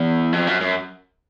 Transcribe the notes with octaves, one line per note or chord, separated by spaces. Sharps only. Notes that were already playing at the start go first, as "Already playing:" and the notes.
Already playing: E2
F2
F#2
F#2